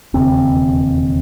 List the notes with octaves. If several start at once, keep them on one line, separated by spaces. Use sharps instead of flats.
E1 D#2 C#3 C4